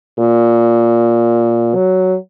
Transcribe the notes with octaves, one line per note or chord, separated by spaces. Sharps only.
A#2
F#3